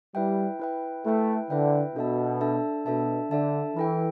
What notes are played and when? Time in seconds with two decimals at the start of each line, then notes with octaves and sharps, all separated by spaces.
0.15 G3 E4 B4 E5 G5
0.60 E4 B4 E5 G5
1.06 A3 E4 B4 E5 G5
1.50 D3 E4 B4 E5 G5
1.95 B2 D4 A4 E5 A5
2.41 D4 A4 E5 A5
2.86 B2 D4 A4 E5 A5
3.31 D3 D4 A4 E5 A5
3.76 E3 E4 A4 G5